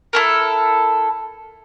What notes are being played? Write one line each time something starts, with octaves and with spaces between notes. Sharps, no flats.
E4 A4 A#4